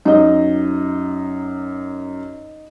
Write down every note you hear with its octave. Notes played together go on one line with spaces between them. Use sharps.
F#2 D#4 D#5